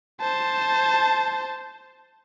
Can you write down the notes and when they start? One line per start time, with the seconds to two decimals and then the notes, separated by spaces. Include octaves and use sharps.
0.21 C5 A5